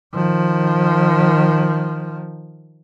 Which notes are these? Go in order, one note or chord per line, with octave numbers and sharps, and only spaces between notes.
D#3 F3